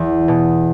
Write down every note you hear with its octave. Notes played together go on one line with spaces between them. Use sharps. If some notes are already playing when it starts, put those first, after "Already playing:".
Already playing: E2
B2